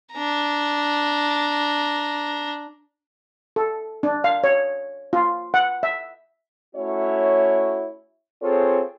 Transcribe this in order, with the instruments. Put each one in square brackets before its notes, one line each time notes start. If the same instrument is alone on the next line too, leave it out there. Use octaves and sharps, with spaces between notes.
[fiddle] D4 A#5
[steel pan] A4
D4
F5
C#5
F4
F#5
E5
[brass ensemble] A3 C#4 E4 F#4 C#5
C4 F4 G#4 A4 C5 C#5